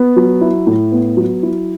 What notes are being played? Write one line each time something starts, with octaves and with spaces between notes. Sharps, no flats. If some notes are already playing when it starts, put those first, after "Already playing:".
Already playing: B3
F#3
E4
A2
B3
F#3
E4